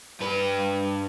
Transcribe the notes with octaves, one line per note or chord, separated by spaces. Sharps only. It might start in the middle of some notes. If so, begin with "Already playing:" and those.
G2 B4